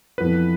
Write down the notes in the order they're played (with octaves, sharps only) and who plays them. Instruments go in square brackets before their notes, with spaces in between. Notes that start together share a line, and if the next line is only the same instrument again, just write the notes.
[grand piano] F2 E3 B3 E4 [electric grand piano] B4